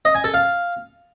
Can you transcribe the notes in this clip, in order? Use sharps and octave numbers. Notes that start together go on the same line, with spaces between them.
D#5
G#5
A4
F5